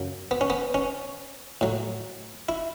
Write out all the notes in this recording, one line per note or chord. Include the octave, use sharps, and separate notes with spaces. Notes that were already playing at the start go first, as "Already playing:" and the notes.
Already playing: F#2 C#3 F#3
B3
C#4
B3
C#4
A2 F#3
E4